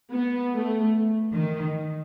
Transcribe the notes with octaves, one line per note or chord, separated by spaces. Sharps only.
B3
A3
D#3